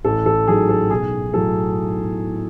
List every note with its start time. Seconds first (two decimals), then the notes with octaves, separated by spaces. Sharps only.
0.04 A1 A4
0.26 A4
0.48 G#2 F#3 G#4
0.69 A4
0.90 B1 G#4
1.33 A2 F#3 A4